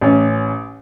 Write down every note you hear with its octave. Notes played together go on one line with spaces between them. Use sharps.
A1 C#4